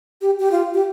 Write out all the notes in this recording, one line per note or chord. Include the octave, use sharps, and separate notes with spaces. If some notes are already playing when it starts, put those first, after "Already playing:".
G4
G4
F4
G4